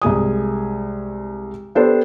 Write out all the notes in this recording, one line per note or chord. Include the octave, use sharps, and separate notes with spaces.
C2 G#3 G#5 D#6
B3 D4 G4 A4 C5